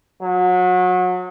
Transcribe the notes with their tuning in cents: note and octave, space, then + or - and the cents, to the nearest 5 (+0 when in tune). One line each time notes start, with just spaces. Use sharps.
F#3 -30